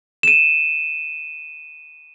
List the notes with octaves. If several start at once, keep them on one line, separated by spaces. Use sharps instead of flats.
D#7 E7